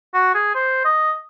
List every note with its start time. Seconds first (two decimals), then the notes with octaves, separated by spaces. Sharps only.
0.14 F#4
0.34 G#4
0.55 C5
0.85 D#5